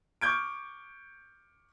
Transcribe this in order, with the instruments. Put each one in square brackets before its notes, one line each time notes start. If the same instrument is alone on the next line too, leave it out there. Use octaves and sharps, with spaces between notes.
[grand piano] C#6 D6 F6 G6 G#6 D7